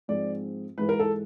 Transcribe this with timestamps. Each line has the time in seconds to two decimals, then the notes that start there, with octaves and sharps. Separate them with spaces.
0.08 G#2 F3 G#3 C4 D5
0.77 G#2 E3 G#3 B4
0.89 A#4
0.99 A4